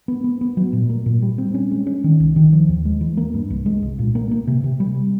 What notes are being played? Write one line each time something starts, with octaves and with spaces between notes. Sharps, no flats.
B3
B3
B3
F#3
A#2
A#3
A#2
G3
C4
C#4
G#3
C#4
D#3
C2
D#3
F3
D#2
G#3
E3
A#3
G2
C2
G#3
C2
A#2
A#3
A#3
C3
C3
G3